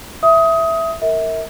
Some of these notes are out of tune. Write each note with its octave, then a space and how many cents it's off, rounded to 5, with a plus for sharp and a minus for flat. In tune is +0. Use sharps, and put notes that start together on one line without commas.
E5 +0 D#6 +20
A#4 -20 E5 -35